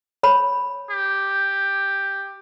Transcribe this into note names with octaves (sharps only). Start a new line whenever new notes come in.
C#5 B5
G4